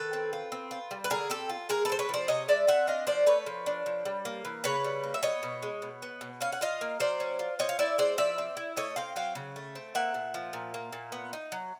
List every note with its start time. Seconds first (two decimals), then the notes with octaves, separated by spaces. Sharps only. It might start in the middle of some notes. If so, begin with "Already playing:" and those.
Already playing: D#3 A4 B4
0.13 C4
0.33 F4
0.52 C4
0.71 F4
0.91 G3
1.04 B4
1.10 D3 G#4 A#4
1.30 C4 G4 A4
1.49 F4
1.69 G#3 G#4 A#4
1.85 A4 B4
1.89 C4 C5
1.99 B4 C#5
2.09 F3 C5 D5
2.28 C3 C#5 D#5
2.48 G#3 D5 E5
2.67 C4 E5 F#5
2.87 D4 D#5 F5
3.07 F3 C5 D5
3.26 A3 B4 C#5
3.46 F3
3.66 D4
3.86 F3
4.05 G3
4.25 A#3
4.45 E3
4.64 C#3 B4 C#5
4.84 G3
5.03 A#3
5.14 E5
5.23 B3 C#5 D#5
5.43 B2
5.62 G#3
5.82 B2
6.02 B3
6.21 B2
6.41 C#4 F5
6.52 F#5
6.61 F4 D#5 F5
6.81 A#3
7.00 F#3 C5 D5
7.20 C#4
7.39 F4
7.59 C4 C#5 D#5
7.69 F5
7.79 E4 D5 E5
7.98 G#3 C5 D5
8.18 F3 D5 E5
8.38 C4
8.57 E4
8.77 A3 C#5 D#5
8.96 C4 F5 G5
9.16 F#3 F5 G5
9.35 C#3
9.56 A3
9.75 C4
9.95 A#3 E5 F#5
10.14 A#2
10.34 F3
10.53 A#2
10.74 A#3
10.93 A#2
11.12 B3
11.33 D#4
11.52 F#3